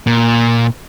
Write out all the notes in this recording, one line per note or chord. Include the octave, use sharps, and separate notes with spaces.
A#2